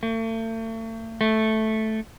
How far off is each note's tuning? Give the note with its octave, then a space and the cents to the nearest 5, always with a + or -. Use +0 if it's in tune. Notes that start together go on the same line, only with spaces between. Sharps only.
A3 +40
A3 -5